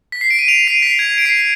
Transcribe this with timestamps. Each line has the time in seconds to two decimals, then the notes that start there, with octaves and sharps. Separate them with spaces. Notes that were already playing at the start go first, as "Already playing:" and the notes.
0.12 B6
0.21 C7
0.30 D7
0.39 D#7
0.48 D7 F7
0.67 C7 D#7
0.82 B6
0.87 C7
0.99 G#6
1.18 D7
1.25 C7